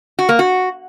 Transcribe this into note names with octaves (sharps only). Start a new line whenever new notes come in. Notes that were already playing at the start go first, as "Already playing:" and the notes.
F#4
A#3
F#4